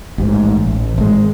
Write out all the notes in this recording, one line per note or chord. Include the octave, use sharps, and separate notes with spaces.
A1 G#2
A1
G#1 G#3